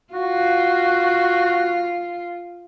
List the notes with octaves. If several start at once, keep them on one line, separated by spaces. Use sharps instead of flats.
F4 F#4